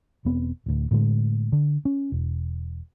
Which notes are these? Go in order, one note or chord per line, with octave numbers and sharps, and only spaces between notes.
E1 B3 C4
D1 D2
A2 D3 G#3
D3
C#4
E1